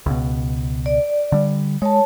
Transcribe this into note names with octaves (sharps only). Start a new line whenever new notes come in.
C#2 B2
D5
D3 G3
G#3 C#5 A5